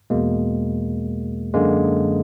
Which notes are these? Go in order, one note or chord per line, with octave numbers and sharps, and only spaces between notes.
E2 B2 G#3 A#3
F#2 D3 G#3 A#3